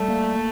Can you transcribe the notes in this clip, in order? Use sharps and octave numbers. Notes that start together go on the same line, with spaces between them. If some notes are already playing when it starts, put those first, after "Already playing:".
Already playing: G3 A3
A#3